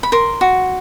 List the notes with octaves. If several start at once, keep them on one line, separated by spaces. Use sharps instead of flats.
B5
A#4 C6
F#4